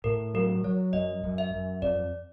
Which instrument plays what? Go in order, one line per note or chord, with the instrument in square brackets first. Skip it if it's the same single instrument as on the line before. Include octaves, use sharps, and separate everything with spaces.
[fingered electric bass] A2 [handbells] A#4
[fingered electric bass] F#3 [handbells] A#4
[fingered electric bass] F#3 [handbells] C#5
[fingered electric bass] F#2 [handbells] D#5
[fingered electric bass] F#2
[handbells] E5
[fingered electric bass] F#2
[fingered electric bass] F2 [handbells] D5